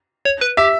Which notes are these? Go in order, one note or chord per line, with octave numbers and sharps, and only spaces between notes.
C#5
B4
G4 E5